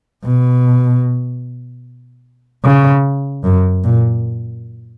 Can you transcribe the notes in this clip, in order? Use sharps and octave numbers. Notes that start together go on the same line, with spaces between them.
B2
C#3
F#2
A#2